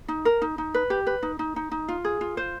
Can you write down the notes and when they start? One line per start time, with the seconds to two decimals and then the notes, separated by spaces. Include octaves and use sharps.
0.08 D#4
0.25 A#4
0.42 D#4
0.58 D#4
0.74 B4
0.90 G4
1.07 B4
1.23 D#4
1.39 D#4
1.56 D#4
1.71 D#4
1.88 F4
2.05 G#4
2.21 F4
2.37 C5